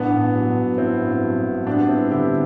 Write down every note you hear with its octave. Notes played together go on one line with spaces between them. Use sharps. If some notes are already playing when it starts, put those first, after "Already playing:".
Already playing: A1 B3 D4
G2
F#3
A1
A1 C4 E4
G2
F#3
A1
G3 B3 D4
G2 C4 E4
D3 E4 G4